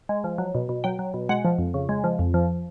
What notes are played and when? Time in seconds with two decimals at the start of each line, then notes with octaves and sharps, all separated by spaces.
0.09 G#3
0.24 F3
0.38 F#3
0.55 B2
0.69 B2
0.84 F#3 G5
0.99 F#3
1.14 B2
1.29 G#3 F#5
1.45 F3
1.58 F2
1.74 C#3
1.89 G#3
2.04 F3
2.19 F2
2.34 F3